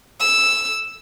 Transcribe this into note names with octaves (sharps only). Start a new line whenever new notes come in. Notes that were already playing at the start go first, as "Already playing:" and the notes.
E6